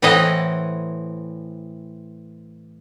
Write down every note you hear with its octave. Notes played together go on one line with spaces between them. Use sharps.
A2 E3 C4 B4 D#5 F#5